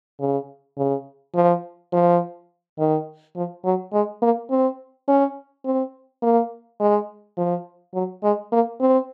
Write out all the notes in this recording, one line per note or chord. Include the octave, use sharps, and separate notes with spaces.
C#3
C#3
F3
F3
D#3
F3
F#3
G#3
A#3
C4
C#4
C4
A#3
G#3
F3
F#3
G#3
A#3
C4